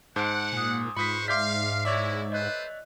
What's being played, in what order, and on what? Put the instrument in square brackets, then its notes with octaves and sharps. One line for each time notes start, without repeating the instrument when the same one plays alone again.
[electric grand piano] G#2 C5 G6 [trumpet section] F#5 [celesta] A5 F#6 D7
[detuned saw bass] A#2 [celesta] G#5 D#6
[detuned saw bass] G#2 [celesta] F4 [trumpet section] B4 C5 C#6 [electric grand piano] B5 D#6 B6
[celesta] D5 E5 C6 [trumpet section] F5 [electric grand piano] D6 G6 B6
[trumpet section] G#3 E4 [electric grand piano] C#5 D5 E5 [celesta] D6
[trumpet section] A4 B4 C5 [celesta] D#5 F#6